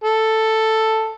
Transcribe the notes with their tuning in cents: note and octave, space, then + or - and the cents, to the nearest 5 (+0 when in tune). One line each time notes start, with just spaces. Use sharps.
A4 +5